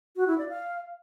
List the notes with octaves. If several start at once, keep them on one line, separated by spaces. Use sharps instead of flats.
F#4
E4
D5
F5